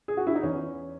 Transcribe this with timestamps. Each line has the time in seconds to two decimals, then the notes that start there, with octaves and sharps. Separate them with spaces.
0.08 G#4
0.17 F#4
0.27 E4
0.35 D#4
0.43 E2 C#4